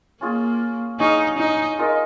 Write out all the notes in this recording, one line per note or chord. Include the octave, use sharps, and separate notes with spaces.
A#3 C#4 F4 G#4
C#4 D#4 G#4 C#5 F5
D#4
G#3 F4 A#4 D#5